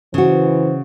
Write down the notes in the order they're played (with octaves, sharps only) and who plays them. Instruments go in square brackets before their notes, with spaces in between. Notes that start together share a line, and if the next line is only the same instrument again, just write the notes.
[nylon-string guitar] C#3 F#4 [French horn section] E3 C5